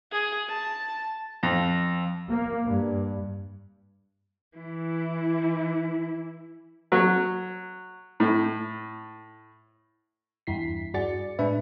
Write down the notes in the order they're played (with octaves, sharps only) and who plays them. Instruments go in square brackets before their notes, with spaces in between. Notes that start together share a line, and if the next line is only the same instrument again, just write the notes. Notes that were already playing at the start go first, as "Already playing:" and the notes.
[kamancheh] G#4
A5
[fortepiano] F2
[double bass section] A#3
G2
[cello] E3 E4
[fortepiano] F#3
A2
[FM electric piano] E2 G2 E4 B6 C7
G2 F#4 G#4 D5 A6 C#7
A2 G#3 D4 B4 E5